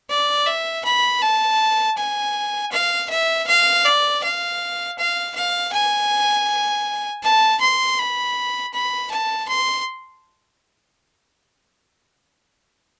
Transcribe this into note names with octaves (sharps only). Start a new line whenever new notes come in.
D5
E5
B5
A5
G#5
F5
E5
F5
D5
F5
F5
F5
G#5
A5
C6
B5
B5
A5
C6